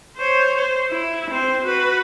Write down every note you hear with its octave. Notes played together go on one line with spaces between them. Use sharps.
C5 C#5
C5
E4
C4 C5
F#4 B4